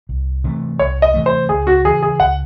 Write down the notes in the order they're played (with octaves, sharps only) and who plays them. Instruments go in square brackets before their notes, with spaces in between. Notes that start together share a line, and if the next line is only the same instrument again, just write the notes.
[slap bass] C2
C3 E3 A3
[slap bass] C2 [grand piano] C#5
[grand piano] D#5
[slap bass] C3 E3 A3
[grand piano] C5
[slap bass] C#2 [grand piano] G#4
[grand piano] F#4
[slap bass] C#3 E3 [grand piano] G#4
[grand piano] G#4
[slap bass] C#2 [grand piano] F#5